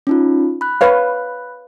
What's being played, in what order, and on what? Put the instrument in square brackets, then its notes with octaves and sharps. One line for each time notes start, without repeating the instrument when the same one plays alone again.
[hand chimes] C#4 D#4 F4
B5 F#6
[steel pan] B4 C#5 F5